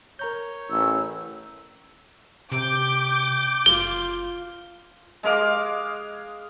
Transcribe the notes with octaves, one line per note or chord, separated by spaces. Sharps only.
A#4 C#5 A#5 G6
A1 E6
C3 G4 D6 G6
F#1 F4 G7
G#3 D#5 F5 D6